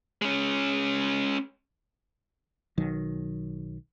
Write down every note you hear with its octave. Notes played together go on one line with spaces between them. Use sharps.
G#3 C#4
B1 D#3 F#3